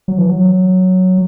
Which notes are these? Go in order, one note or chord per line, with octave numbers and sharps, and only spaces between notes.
F#3
E3
F#3